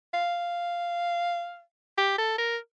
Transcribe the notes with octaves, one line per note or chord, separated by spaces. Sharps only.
F5
G4
A4
A#4